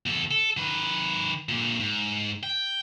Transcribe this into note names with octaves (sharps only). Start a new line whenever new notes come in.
E2 A4
A4
D#3 B4
A#2 D3
G#2
G5